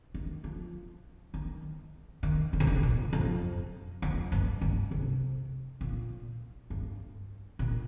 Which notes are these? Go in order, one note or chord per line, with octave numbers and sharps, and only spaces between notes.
D#3
F3
D#3
D#3
D3
C3
D3
A#2
F2
F2
G2
G2
C3
A#2
G2
A#2